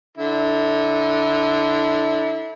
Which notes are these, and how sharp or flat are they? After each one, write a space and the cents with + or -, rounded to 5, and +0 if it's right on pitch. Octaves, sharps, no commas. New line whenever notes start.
D3 +0 E4 -30